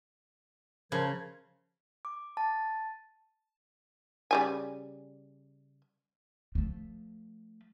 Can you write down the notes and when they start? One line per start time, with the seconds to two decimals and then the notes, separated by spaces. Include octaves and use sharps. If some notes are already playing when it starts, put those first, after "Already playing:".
0.92 C#3 F3 A#4 C5 G#6
2.05 D6
2.37 A5
4.31 C#3 G3 G#5
6.55 F3 A3